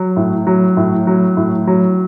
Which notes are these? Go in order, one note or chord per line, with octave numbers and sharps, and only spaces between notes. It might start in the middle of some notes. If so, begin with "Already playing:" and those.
Already playing: F#3
A2
F#3
A2
F#3
A2
F#3